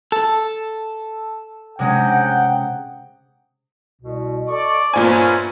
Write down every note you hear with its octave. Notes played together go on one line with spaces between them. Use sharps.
A4
C3 G#3 C#4 F#5 G5
C2 B2
A4 D5 D#5 C#6
G1 A#2 C#4 C5 D5 G#5